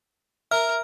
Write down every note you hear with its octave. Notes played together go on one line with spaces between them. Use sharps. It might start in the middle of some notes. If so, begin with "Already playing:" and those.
A#4 E5 F6